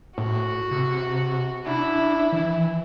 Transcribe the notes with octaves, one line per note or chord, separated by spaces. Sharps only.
A2 F#4
C3
D4 E4
E3